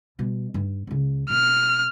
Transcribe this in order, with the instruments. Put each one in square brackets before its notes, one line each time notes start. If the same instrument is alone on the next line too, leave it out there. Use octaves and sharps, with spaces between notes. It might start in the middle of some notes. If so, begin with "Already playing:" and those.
[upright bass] B2 G3
G2 D#4
C#2 C#3
[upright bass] B2 [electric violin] F6